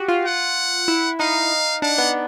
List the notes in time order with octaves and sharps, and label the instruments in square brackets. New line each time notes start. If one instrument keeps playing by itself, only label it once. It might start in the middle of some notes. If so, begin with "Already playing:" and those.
Already playing: [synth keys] F#4 G4
F4
[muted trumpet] F#5
[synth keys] E4
[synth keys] D#4 [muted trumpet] F5
[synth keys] D4 [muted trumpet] F#5
[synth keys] B3